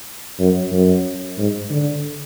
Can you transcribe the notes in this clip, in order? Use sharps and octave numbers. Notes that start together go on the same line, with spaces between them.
F#2
F#2
G#2
D3